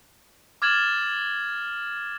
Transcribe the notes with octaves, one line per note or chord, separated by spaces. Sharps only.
D6 F6 G#6 A6 E7 F#7